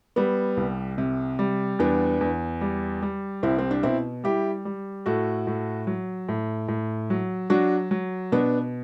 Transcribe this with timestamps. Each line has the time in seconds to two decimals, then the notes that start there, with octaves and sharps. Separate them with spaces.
0.16 G3 B3
0.57 C2
0.98 C3
1.39 G3
1.79 E2 B3 D4
2.21 E2
2.61 G3
3.02 G3
3.43 C2 C4 E4
3.58 C4
3.71 D4
3.83 B2 C4 E4
4.24 G3 E4 G4
4.65 G3
5.06 A2 F#4 A4
5.47 A2
5.87 F#3
6.29 A2
6.68 A2
7.10 F#3
7.50 F#3 D4 F#4
7.91 F#3
8.32 B2 B3 D4